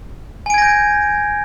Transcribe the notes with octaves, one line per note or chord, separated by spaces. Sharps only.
G#5 G6 G#6 A#6 D7